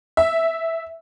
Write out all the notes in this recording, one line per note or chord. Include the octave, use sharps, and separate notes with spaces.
E5